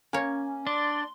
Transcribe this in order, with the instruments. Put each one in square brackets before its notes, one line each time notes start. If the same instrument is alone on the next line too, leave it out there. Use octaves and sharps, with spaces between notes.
[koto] A#3 C#5 [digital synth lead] C#4
[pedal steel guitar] D4 [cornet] D5 [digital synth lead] C6